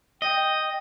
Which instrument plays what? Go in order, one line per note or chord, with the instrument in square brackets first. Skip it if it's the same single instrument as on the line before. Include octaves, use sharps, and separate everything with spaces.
[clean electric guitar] D#5 [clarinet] G5